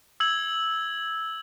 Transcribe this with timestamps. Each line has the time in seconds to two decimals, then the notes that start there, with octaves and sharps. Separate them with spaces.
0.20 E6 G#6 F#7